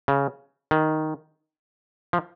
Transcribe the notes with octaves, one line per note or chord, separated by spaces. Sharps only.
C#3
D#3
F3